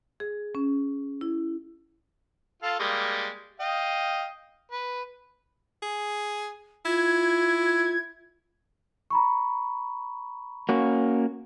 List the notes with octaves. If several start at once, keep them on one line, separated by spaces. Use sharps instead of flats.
G#4
C#4
E4
F4 A4 F5
G3 G#3 A#3
D#5 F5 G5
B4
G#4
E4 F4 G#6
A#5 B5 C#6
A#3 C#4 F#4